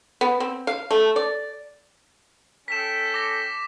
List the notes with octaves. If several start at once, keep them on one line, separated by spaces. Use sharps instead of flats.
B3
C4
F5
A3
D5
C#4 A4 G5 B6 E7
D6 A#6